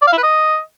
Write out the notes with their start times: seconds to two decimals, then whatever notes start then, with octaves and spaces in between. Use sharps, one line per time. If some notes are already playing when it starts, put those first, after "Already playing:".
0.02 D5
0.07 F5
0.12 E4
0.18 B4
0.23 D#5